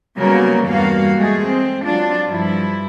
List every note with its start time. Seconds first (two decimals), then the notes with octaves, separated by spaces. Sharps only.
0.18 C#3 F#3 G3 A#3 B3 A#4
0.67 E2 G2 A#3 F#4 F5
1.16 G#3 A3 G#4
1.46 C4
1.83 F#3 D4 F4
2.27 G2 F3 E4